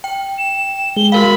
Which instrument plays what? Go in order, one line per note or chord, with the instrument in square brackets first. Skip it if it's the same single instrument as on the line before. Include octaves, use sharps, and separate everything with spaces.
[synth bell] G5
[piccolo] E7
[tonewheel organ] G#3 [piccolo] G7
[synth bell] F#4 A#4 F5 [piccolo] B5